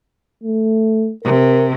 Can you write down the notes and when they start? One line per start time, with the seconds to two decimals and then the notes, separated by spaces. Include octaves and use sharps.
0.43 A3
1.25 C3 A#4